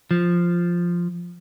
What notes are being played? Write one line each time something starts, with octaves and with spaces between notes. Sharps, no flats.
F3